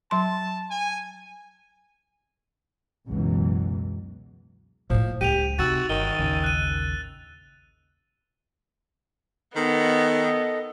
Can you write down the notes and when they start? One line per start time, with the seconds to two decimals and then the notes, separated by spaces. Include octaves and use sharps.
0.11 F#3 A5 C6
0.70 G#5
3.08 F#1 C#2 B2 E3 F#3
4.90 A2 F3 A#3
5.21 C#2 G4 D#7 F7
5.59 C3 D#4 F#4 E6 A6
5.90 G1 D#3 G7
6.19 A1 D#2 C#3
6.44 F#6 D#7
9.55 D#3 B3 A4 D#5